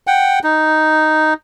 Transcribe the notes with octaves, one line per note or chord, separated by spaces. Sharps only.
F#5 G5
D#4